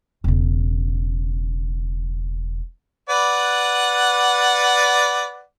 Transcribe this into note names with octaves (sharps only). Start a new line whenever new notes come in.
E1 C#3
B4 D5 F#5